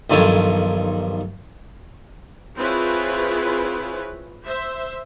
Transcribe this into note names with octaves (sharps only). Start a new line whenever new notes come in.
B1 G2 D#3 F3 A4 C#5
C4 E4 F4 G#4 B4 C#5
C5 E5